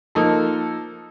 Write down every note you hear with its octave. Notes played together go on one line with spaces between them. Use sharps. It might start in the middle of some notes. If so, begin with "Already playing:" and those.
F3 A#3 D#4 A4